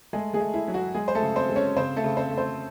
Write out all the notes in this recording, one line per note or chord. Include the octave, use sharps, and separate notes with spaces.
G#3 A3 G#4
G#3 G#4
A3
E4
F#3
F#4
G#3 G#4
C5
A3 A4
C#3
C4 C5
G#3
C#4 C#5
C#3 C4 C5
A3 A4
C#3
C4 C5
A3
C4 C5